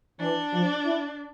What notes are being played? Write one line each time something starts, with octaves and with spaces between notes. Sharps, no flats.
E3 D4
F3
E4